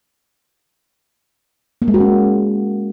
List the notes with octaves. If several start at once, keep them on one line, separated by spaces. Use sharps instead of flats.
A#3
G#3
F#4
C#4